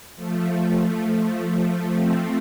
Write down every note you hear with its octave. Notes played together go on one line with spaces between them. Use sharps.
F3 A3
A3 C4